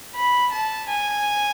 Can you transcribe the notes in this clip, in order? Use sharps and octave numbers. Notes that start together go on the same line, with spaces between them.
B5
A5
G#5